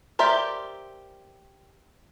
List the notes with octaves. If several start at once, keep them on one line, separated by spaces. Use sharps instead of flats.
G4 A#4 C5 D5 E5